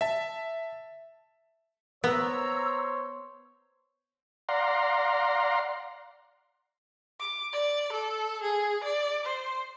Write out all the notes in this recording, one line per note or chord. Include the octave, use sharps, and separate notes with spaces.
E5 A5
B3 C5 C#5 A#5 E6
D5 F5 F#5 A#5 C6
D6
D5
A4
G#4
D5
C5